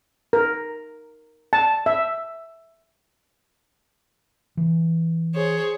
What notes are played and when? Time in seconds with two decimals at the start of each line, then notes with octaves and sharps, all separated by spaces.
0.33 A#4
1.53 A5
1.86 E5
4.57 E3
5.34 G#4 C5 C#5